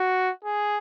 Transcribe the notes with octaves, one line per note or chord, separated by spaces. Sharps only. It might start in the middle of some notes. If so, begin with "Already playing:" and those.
Already playing: F#4
G#4